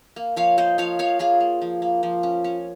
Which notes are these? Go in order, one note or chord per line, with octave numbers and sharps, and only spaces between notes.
A#3
F3 C#5 F5
A#3 C5 D#5
F3 C#5 F5
F3 C#5 F5
A#3 F4 G#4
A#3
F3
A#3
F3
C#4
C#4